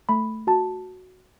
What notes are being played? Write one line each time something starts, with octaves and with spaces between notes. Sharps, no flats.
A3 B5
F#4 A5